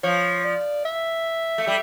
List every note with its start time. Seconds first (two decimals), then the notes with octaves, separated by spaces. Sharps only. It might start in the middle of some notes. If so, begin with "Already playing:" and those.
0.03 F3 C#5
0.44 D5
0.85 E5
1.58 A3
1.67 G3